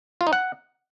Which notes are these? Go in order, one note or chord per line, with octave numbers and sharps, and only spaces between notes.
F4
D#4
F#5